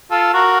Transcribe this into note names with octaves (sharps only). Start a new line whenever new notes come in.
F4 A4
F#4 A#4